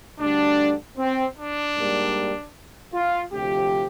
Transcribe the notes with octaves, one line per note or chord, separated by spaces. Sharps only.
D2 D3 G3 D4
C4
D4
G#2 G3 A#3
F4
D2 C3 F3 G4